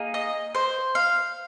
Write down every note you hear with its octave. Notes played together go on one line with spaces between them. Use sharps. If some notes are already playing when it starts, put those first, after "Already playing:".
Already playing: A#3 D#4 G#4
D#5
C5
F5